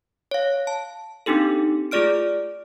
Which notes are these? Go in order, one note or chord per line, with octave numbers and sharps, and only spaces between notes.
C#5 F5
A5
C4 D4 D#4 G4 A4
A3 F4 G#4 D5 F6 D7